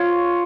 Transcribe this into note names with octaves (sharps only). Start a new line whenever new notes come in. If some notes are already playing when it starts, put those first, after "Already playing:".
Already playing: F4 C#5 F5